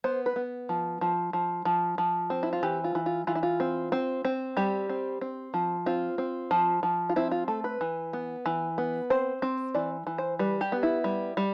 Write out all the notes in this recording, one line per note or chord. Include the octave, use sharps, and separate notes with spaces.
B3 C5
B4
B3
F3
F3
F3
F3
F3
C4
E4
F4
E3 G4
F4
E3
F4
E3 F4
E4
F4
C4
C4
C4
G3 G4
C4
C4
F3
C4 F4
C4
F3
F3
F4
C4 E4
F4
A3 A4
B4
E3
B3
E3
B3
C4 C5
C4
E3 D5
E3
C5
G3 B4
G4
B3
E4
G3
G3